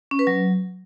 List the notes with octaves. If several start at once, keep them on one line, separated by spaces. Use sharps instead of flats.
C#4
B4
F#3